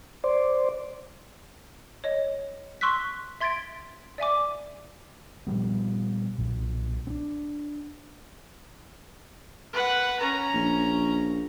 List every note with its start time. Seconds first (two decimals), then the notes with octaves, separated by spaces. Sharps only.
0.24 C5 D5
2.04 C#5 D#5
2.81 C6 C#6 E6 F#6 B6
3.40 E5 C6 G#6 A6 B6 D7
4.18 D5 E5 G#5 D6
5.47 A#2 F3 G3 B3
6.38 B1 A#2
7.07 C4 D4
9.73 B4 F#5
10.20 C#4 A#5
10.54 A#1